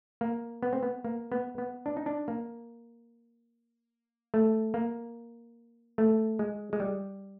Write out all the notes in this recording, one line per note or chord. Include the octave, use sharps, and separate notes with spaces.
A#3
B3
C4
B3
A#3
B3
B3
D4
D#4
D4
A#3
A3
A#3
A3
G#3
G#3
G3